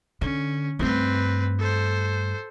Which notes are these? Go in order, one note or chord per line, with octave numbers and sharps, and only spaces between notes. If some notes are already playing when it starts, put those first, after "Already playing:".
D3 C#4
G2 A3 C4 B4
A4 C5